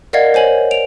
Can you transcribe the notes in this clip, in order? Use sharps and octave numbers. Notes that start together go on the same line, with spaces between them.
A#4 D5 D#5 F5 F#5 G#6
C5 C#5 G#5 F#7
D7 F7